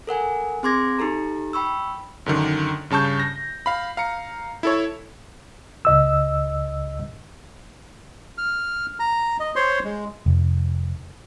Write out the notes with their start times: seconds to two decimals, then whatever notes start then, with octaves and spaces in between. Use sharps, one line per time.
0.07 A4 A#4 F#5 G#5
0.63 C4 G#4 C6 D6 G#6 A#6
0.99 D#4 G4 A4 A#5
1.53 G5 B5 C#6 E6
2.26 F#2 D3 D#3
2.90 G2 C#3 A5 C#6 G6
3.20 A#6
3.66 F5 B5
3.97 F5 A#5 C#7
4.63 E4 A4 C#5
5.85 C#2 D#5 E6
8.38 F6
9.00 A#5
9.40 D#5
9.56 C5 C#5 C6
9.84 G#3
10.26 F1